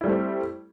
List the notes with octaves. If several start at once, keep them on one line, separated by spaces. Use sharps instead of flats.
G3 A3 C4 E4